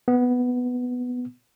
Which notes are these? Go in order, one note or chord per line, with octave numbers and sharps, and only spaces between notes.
B3